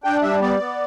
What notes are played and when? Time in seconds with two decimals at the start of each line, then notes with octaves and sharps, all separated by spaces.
0.04 D4 G5
0.22 G3 E5
0.41 B3 D5
0.60 B3